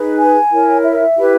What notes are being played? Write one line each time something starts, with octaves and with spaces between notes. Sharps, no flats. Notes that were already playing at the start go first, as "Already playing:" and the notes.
Already playing: D#4 G#4 B4
G#5
E4 A#4 C#5
E5
E4 G4 B4